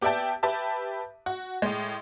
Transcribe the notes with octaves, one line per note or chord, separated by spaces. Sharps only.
B3 G4 D5 E5 G5 A5
G4 B4 E5 A5
F#4
A2 G#3